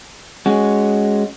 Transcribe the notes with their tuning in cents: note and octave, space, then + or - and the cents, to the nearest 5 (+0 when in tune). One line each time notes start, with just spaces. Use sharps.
G#3 +0 C#4 +0 F#4 +10